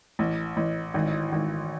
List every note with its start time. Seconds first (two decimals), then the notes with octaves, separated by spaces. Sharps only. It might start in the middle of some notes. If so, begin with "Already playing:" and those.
0.19 A1
0.57 A1
0.94 G#1
1.32 G#1